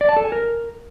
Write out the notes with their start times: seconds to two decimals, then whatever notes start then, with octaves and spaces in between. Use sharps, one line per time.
0.01 D5
0.09 A5
0.16 A4
0.24 G#5
0.32 A#4